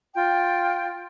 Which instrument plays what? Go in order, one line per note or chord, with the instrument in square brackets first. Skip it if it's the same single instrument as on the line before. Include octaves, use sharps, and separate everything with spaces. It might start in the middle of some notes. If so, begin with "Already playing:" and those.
[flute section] F4 G5